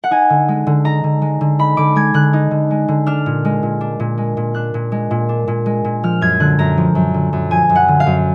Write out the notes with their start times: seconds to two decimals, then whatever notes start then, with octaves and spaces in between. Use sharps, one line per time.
0.04 F#5
0.11 D#4 G#5
0.30 D3
0.48 G#3
0.67 D3
0.85 D#4 A#5
1.04 D3
1.22 G#3
1.41 D3
1.59 D#4 B5
1.77 D3 D6
1.96 G#3 G#6
2.14 D3 F#6
2.33 D#4
2.51 D3
2.71 G#3
2.88 D3
3.07 D4 F6
3.26 A#2
3.45 G#3
3.63 A#2
3.81 D4
4.00 A#2
4.18 G#3
4.37 A#2
4.55 D4 F#6
4.74 A#2
4.92 G#3
5.11 A#2
5.29 D4
5.48 A#2
5.66 G#3
5.85 A#2
6.03 F3 F6
6.21 F#2 G#6
6.40 D3 F#6
6.59 F#2 A#5
6.78 F3
6.95 F#2
7.14 D3
7.33 F#2
7.51 F3 G#5
7.69 F#2
7.76 F#5
7.88 D3
8.00 F5
8.06 F#2